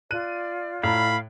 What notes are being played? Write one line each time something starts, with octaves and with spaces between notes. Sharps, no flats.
F4 D5 F#6 D#7
A2 F5 A#5 B5